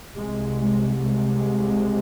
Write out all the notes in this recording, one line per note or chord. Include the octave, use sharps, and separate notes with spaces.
C2 C3 G#3
G#3
G#3